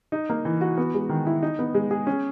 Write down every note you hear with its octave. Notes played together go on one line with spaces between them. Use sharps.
D#4
A#3
E3
F#4
B3
G#3
D#3
E4
D#4
B3
G#3
G#4
C#4